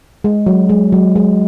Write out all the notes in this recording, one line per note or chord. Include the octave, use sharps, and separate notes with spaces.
G#3
F#3
G#3
F#3
G#3